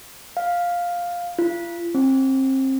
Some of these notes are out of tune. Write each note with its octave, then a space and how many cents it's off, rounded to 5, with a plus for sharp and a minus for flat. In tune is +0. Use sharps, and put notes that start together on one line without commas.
F5 +5
F4 -35
C4 +30